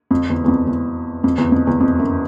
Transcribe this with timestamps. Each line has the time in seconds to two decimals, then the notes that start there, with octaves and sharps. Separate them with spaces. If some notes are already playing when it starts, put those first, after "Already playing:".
0.11 F2
0.30 E2
0.44 E2
0.48 F2
0.67 E2
1.24 F2
1.38 E2
1.52 F2
1.67 E2
1.80 F2
1.99 F#2